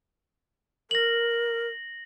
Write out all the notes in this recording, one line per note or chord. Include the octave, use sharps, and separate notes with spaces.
A#4 A#6 F#7